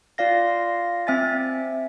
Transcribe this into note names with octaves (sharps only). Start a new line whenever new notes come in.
F4 D5 F5 A#6
C4 E5 G#5 A6